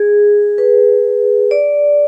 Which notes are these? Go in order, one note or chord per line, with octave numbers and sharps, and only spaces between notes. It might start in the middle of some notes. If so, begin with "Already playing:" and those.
Already playing: G#4
B4
D5